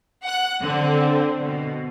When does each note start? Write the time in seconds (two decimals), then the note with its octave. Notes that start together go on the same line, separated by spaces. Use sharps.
0.24 F#5 F#6
0.62 D3 C4
1.42 B2